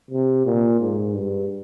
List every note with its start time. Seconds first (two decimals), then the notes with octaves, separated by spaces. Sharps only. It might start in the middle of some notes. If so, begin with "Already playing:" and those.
0.11 C3
0.45 A#2
0.80 G#2
1.15 G2